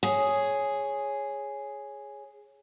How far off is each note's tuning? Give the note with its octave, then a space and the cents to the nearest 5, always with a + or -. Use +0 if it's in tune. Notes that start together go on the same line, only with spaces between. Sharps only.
G#4 +0 C#5 +0